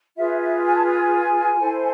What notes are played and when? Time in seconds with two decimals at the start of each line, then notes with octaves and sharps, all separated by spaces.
0.16 F4 G#4 B4 E5
0.40 E5
0.65 G#5
0.75 A5
0.85 G#5
1.59 E4 A4 C5